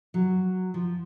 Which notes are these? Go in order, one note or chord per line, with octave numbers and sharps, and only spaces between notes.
F#3
F3